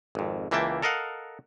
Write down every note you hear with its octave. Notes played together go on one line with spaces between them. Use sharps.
G#1 F2
C#2 E3 A#3 E5 G5 A5
A4 A#4 D#5 F5 F#5